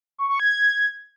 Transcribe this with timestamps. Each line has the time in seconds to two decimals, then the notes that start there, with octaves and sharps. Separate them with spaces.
0.18 C#6
0.29 C#6
0.40 G#6